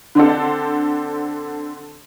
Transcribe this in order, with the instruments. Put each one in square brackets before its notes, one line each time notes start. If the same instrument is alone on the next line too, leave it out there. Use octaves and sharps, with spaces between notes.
[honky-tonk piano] D3 C4 D4 A4